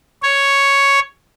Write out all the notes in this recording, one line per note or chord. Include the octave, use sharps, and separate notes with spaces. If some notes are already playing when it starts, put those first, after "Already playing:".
C#5